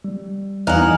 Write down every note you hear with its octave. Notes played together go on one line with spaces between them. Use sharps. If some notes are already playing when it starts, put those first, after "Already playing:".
G3
E2 D#4 F5 F#5 G#5 A#5 F#6